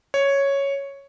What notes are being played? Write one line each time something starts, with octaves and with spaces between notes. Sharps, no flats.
C#5